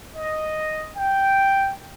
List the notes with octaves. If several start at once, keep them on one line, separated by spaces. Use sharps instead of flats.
D#5
G5